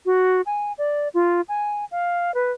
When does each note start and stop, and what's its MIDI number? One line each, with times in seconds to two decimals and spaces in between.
0.06 0.41 66
0.46 0.72 80
0.78 1.08 74
1.14 1.41 65
1.49 1.85 80
1.91 2.34 77
2.34 2.52 71